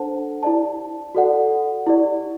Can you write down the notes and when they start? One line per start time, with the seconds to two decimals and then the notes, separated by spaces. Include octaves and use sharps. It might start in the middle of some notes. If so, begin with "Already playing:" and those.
Already playing: D4 A4 C5 F#5 A5
0.43 E4 G4 D5 A5
1.15 F#4 A4 D5 F#5
1.87 E4 G4 D5